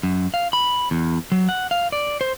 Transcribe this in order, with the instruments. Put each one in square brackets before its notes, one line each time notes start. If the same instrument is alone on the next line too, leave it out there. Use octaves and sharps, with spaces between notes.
[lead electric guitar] F#2
F5
B5
E2
F#3
F#5
F5
D5
C5